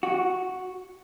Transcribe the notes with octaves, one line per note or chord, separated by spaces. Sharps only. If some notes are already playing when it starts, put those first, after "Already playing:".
F#4